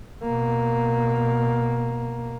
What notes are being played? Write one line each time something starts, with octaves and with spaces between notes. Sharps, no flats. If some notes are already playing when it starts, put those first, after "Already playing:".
B2 A#3